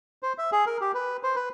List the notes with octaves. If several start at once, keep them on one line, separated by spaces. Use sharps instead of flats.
C5
E5
G#4
A#4
G4
B4
C5
B4